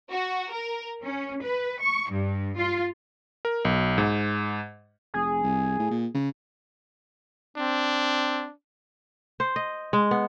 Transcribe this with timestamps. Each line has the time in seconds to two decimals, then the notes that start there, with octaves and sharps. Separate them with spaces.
0.12 F#4
0.52 A#4
1.03 C#4
1.43 B4
1.81 C#6
2.11 G2
2.58 F4
3.45 A#4
3.65 B1
3.98 G#2
5.14 F1 G#4
5.43 C2
5.79 A2
5.90 A#2
6.14 C#3
7.57 C4 D4
9.40 C5
9.56 D#5
9.93 G#3
10.11 B3